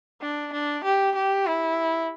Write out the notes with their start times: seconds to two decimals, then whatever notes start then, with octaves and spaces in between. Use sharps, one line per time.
0.21 D4
0.53 D4
0.84 G4
1.16 G4
1.46 E4